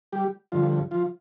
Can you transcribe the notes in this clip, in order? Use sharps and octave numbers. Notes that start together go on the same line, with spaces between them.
G3 G4
G2 D3 F3 F4
F3 F4